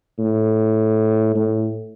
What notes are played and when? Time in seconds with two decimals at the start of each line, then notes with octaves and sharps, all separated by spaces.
0.19 A2
1.35 A2